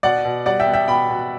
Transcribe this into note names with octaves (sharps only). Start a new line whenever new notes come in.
B2 D5 F#5
B2
G3 D5 F#5
E5 G5
B3
E5 G5
B2 G5 B5
B2